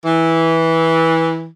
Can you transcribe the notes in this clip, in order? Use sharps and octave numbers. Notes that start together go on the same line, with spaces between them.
E3